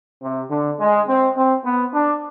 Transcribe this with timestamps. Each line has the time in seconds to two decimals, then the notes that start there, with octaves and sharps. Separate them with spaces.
0.23 C3
0.51 D3
0.80 G#3
1.08 C4
1.36 C4
1.65 B3
1.94 D4